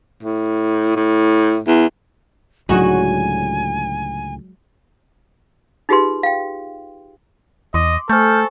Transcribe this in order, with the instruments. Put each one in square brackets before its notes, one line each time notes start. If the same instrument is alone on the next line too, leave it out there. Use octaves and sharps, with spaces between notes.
[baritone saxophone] A2
A2
E2
[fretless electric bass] C#2 A2 D3 [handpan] F#3 G#3 [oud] D#4 F#4 [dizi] G#5
[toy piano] D#4 F4 G4 G#4 B4 C6
F5 G5
[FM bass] E2 [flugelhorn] D#5 [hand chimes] C6 D6
[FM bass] A3 [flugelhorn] A4 [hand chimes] C5 G#5 C#6 [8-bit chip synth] F6 G6